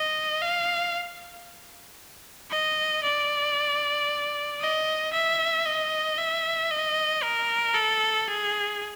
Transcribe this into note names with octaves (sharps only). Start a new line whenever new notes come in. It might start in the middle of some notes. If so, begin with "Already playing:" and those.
Already playing: D#5
F5
D#5
D5
D#5
E5
D#5
E5
D#5
A#4
A4
G#4